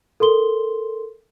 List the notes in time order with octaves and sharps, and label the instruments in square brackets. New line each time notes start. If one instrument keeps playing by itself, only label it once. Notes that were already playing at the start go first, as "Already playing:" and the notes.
[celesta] A4 A#4 C6 G7